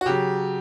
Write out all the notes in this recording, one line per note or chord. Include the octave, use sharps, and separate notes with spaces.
F#4
C#3 F#3 G4